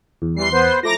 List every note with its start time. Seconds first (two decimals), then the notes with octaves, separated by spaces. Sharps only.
0.22 E2
0.36 E3 G3 C6 C7
0.53 B3 B4 C5
0.83 F3 A3 E4 A#5 D6 A#6